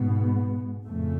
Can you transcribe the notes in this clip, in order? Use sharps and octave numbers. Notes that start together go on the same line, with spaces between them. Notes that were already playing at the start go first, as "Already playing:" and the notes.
Already playing: G#2 B2 B3
F2 A2 C#3 A3